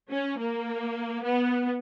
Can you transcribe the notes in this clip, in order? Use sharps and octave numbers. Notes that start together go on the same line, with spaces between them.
C#4
A#3
B3